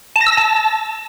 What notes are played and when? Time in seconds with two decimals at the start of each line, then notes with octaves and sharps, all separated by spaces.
0.16 A5
0.21 A#6
0.27 E6
0.32 A#6
0.37 A5